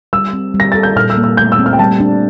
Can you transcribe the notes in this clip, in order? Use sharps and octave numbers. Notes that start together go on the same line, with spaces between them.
G3 E6
C4
G3
A#6
A4 A6
G6
A#2 F6
E6
A#3
E6
A3 G6
E6
C4
F6
G5
G3 A5
D4